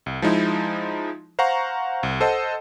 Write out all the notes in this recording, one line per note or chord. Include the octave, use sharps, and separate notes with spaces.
C2
F3 G#3 D#4 E4
C5 F5 F#5 A#5 C#6
C2
A4 C5 D#5 F#5 A5